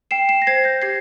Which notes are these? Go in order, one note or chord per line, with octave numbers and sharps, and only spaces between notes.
G5 C7 E7
C7 E7
A#6
C5 G#6 C7
G6 A#6
G4 G#6 C7